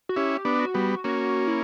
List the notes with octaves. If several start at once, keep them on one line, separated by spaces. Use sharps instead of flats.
F#4
C#4 E4 G4
B3 D4
F#4
G3 B3
A#3 C#4 F#4
E4